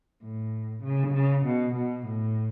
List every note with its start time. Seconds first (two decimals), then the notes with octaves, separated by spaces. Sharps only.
0.23 A2
0.84 C#3
1.15 C#3
1.46 B2
1.76 B2
2.07 A2